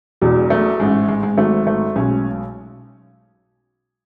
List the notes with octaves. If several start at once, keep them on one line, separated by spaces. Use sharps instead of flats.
E1 E2 B2 F#3
A3
A1 G#2 G#3
G#3
G#3
G#1 G#2 F#3 A3
A3
B1 B2 G#3 C#4